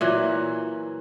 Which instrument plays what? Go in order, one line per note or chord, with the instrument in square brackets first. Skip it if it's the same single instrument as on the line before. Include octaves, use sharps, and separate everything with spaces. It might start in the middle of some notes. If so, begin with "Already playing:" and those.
[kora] A#2 E3 F#3